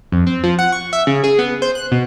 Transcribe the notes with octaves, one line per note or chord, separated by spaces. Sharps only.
F2
C4
F3
F#5
C#6
E5
C#3
G#4
B3
C5
F#6
B2